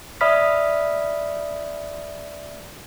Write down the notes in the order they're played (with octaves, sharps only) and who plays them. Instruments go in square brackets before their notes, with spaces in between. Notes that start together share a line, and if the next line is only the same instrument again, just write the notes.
[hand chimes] D5 E5 B5 D#6 F6 B6